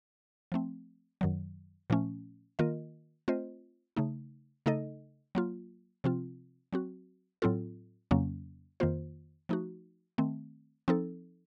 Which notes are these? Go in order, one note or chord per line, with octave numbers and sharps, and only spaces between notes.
F3 A3 C4
F#2 D#3 F#3
A#2 F3 A3 C#4
D#3 A#3 F4 A#4 D#5
A3 C4 F4 C5 D#5
C#3 A3 D#4
C#3 A3 D#4 A4 D#5
F#3 A#3 F4
C3 F3 C4 F4
F#3 C4 F#4
A2 F#3 C4 F4 A4
F2 C#3 F#3 A#3 C#4
F2 D#3 A#3 F4 C5
F3 A3 D#4 F#4
D#3 A3 C4
F3 C4 D#4 A4